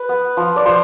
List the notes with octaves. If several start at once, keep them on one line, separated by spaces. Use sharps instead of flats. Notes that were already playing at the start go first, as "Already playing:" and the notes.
Already playing: B4
B3
F3
D5
F3 C5